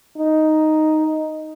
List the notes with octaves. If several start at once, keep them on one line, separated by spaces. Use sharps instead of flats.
D#4